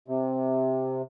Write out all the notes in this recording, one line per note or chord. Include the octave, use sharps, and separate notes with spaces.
C3